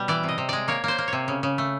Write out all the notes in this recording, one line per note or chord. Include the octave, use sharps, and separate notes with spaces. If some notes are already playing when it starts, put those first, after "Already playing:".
Already playing: B2 G3
E3 D5
C3
D#5
C3
G#3 D5
A#3 C#5
A#3 C5
A#3
C3 C#5
C#3
C#3
A3